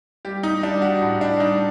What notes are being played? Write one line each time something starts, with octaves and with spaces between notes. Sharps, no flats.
G3 G4
D#4
G3 D4
F#4
A2
D4
G3 D#4